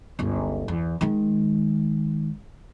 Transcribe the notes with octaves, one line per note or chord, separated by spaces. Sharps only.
G1 C#2
E2
D#3 G#3